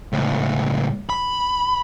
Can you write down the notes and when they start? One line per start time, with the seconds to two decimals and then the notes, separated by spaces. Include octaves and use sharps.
0.13 C#2 A2
1.10 B5